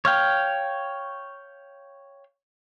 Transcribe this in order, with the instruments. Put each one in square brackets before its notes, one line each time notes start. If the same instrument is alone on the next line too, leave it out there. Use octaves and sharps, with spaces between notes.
[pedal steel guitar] C#5 F5 G5